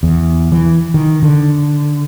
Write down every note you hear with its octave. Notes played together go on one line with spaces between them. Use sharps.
E2
E3
D#3
D3